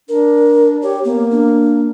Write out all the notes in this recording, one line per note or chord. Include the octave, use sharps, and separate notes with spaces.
D4 A#4
G4 C#5
A#3 B3
D4